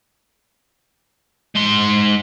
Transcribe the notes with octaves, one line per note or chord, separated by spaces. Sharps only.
G#2 C6